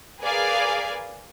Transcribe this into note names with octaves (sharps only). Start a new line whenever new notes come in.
G#4 A#4 B4 D5 F5 G#5